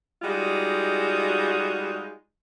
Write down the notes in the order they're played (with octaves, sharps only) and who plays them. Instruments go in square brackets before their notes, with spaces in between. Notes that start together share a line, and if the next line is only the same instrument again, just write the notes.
[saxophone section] G3 G#3 D#4 F4 F#4